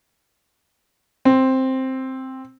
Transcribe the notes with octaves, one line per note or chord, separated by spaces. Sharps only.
C4